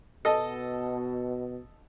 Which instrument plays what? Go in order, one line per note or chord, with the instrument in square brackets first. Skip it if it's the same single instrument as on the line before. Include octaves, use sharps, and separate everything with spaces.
[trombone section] B2 [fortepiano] A4 D#5